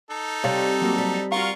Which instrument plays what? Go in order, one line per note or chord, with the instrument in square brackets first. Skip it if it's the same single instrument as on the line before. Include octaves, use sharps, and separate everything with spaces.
[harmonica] D#4 A4
[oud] C3 G3 [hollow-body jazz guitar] G4 C#5 F5
[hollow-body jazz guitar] F#3 A#3
[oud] G3
[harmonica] F4 A#4 C#6 [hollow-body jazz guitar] F#4 F5